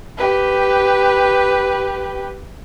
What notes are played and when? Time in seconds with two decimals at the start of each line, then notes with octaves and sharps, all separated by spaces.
0.17 G4 B4